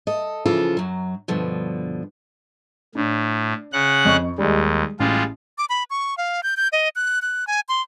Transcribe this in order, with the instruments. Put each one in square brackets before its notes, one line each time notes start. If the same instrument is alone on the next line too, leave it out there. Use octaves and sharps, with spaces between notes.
[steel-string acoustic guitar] A4 D#5
C#3 E3 F3 F4 A4
F#2 F#3
G2 B2 D3 F3
[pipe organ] A2 [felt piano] D4
[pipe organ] C#3 F#5 F#6
[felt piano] F2 D#5 C#6
[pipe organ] D#2 [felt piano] G3 G#3
[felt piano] A1 [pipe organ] G3 G#3 F4
[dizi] D6
B5
C#6
F5
G6
G6
D#5
F#6
F#6
G#5
C6